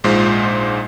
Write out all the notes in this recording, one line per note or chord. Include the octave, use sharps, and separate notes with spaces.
A#1 G#2 G#3 F4 C5